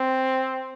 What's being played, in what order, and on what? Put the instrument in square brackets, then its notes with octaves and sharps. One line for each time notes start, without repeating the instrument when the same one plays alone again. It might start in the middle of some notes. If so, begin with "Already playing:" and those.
Already playing: [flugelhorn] C4